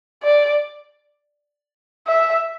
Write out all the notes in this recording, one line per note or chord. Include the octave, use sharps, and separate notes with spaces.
D5
E5